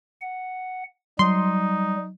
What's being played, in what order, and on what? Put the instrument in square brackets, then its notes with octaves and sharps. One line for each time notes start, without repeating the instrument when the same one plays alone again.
[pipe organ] F#5
[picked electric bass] F#3 [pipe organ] G3 [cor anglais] D#4 [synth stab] C6